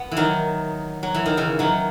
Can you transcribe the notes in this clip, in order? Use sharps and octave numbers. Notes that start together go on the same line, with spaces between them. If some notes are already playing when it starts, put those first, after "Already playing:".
Already playing: B3
E3
D#3 F#3
F#3
E3
D#3
C#3 E3
D#3 F#3